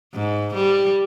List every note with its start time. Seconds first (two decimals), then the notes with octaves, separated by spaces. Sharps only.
0.14 G#2
0.54 G3